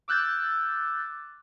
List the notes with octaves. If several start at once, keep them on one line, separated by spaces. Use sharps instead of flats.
D6 E6 F#6 G6 A6